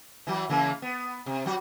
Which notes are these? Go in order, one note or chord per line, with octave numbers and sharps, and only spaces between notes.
E3 F#3
C#3 E3 A#3
B3
C3
F#3 F#4